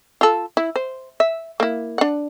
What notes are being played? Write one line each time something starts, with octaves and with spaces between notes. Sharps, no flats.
F4 A4
E4
C5
E5
A#3 E4
D4 F#5